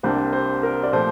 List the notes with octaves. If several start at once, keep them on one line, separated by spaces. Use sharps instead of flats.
C2 C3 G3 A#3 D4 C5
C5
A#4
D5
A#2 F3 A3 C5